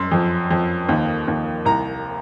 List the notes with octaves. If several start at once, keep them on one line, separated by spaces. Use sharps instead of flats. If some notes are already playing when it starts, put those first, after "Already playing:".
Already playing: F#2 C6
F2
F2
D#2
D#2
C2 A#5